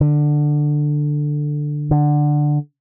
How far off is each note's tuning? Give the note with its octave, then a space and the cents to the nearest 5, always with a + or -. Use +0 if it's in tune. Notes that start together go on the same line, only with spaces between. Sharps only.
D3 +10
D3 +10